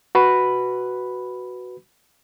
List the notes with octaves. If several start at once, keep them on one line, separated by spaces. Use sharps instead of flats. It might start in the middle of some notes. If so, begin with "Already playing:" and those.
F#4 B4 B5